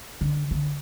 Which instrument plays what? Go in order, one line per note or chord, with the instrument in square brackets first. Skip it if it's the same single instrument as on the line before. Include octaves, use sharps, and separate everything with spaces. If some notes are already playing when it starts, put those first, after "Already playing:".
[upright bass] D3
D3